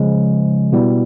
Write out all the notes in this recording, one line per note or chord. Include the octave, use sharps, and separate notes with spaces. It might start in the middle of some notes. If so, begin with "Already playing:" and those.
Already playing: C#3 F3 G#3
B2 G3 B3 E4